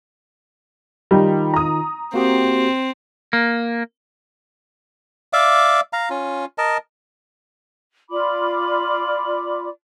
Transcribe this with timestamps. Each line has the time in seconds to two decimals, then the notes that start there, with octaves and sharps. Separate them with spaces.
1.11 D#3 G3 D#4 F4
1.54 A#5 D#6
2.14 A#3 C4 F#4 G4
3.33 A#3
5.33 D5 E5 F5 D6
5.93 F5 A#5
6.10 C#4 F4
6.58 A#4 D#5 A5
8.10 F4 D5 B5 D6